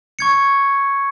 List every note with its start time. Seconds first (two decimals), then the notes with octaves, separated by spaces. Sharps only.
0.19 C#6 G#6 C#7